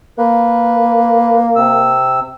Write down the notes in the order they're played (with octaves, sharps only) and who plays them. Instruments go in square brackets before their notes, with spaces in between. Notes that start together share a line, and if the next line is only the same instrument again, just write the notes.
[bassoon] A#3 [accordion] B4
[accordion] C3 E6